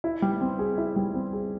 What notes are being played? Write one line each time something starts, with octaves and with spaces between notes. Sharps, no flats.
E4
G3
C4
G#4
E4
G3
C4
G#4